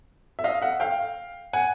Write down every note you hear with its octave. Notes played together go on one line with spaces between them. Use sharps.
E5
D#5 F5
E5 F#5
F5 G5
F#5 G#5